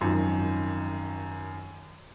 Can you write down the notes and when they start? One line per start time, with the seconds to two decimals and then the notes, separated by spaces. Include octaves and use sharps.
0.01 G#1 F#2 D#3 F3